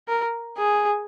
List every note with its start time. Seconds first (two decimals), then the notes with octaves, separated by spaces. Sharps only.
0.08 A#4
0.58 G#4